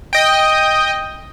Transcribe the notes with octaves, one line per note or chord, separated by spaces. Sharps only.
D#5 G5